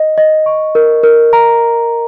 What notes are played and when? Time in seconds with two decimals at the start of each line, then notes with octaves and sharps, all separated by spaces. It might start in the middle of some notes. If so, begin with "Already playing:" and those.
Already playing: D#5
0.18 D#5
0.46 C#6
0.75 A#4
1.03 A#4
1.33 A#5